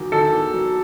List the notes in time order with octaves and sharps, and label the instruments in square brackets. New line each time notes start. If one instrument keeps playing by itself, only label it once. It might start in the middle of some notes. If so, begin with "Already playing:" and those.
Already playing: [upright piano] E2 D#3 F#3
[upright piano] D#3 [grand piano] A4
[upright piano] E2
F#3